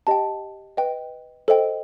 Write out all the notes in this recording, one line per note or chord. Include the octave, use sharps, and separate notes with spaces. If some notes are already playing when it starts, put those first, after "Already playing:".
G4 D#5 G5 A5
B4 D#5 G5
A4 C5 D#5 G5